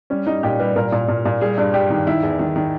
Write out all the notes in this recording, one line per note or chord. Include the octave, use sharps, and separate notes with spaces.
G3 C#4
G3 D#4
A#2 G4
G3 B4
A#2 A#4
A#2
A#2
A#2
G3 G#4
G2
G3 G4
D#3
D#3 E4
E2
D#3
D#3